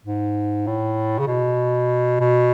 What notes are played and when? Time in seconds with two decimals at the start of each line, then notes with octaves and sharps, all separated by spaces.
0.05 G#2
0.67 A2
1.19 C#3
1.27 B2
2.20 B2